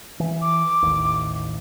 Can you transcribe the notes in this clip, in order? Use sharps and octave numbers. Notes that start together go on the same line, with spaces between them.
E3
D6
A1 D#2